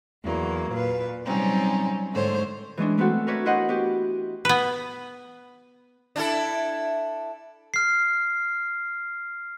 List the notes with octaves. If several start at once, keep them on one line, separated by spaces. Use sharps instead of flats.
E2 F#3 A#3
A#2 B4
C3 F#3 G3 C4 C#4 D#4
G#2 D3 A3 C5 C#5
E3 G#3 C#4 D4
A3 B3 C4 F#4 A4
A#4 B4 C#5 D5 E5
E4 F#4 C5 D#5 F#5
B3 G4
B3 B4
D4 E4 A4
F6 C7